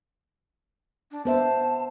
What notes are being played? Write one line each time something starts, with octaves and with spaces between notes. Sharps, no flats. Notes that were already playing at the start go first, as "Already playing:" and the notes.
D4
B3 C5 E5 A5